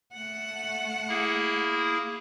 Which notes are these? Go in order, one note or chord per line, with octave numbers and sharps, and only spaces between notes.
A3 F#5
A#3 E4 G#4